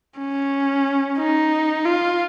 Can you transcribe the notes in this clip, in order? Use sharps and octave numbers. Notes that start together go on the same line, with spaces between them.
C#4
D#4
F4